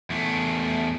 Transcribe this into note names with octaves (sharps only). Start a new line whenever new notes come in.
E2 A3